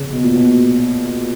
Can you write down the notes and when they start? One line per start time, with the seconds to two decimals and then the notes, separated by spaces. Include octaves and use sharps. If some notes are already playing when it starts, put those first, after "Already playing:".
Already playing: C#3
0.12 B2
0.23 A#2
0.34 B2